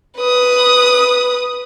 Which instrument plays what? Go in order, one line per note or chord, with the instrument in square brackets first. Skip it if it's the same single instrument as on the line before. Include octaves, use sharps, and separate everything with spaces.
[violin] B4 D#6